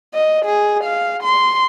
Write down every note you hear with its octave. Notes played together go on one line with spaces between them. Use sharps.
D#5
G#4
F5
C6